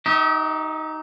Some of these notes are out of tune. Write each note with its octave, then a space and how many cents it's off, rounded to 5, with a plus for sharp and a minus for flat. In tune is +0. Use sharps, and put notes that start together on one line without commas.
D#4 +5 G4 -30 E5 -40